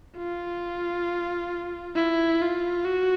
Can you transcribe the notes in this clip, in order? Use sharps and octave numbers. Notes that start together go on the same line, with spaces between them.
F4
E4
F4
F#4